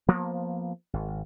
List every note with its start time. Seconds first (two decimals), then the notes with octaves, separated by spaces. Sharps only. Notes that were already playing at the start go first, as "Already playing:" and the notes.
0.08 F3 A#3 B3
0.93 G#1